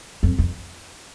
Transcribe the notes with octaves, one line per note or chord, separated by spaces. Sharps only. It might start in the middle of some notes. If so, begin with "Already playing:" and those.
F2
F2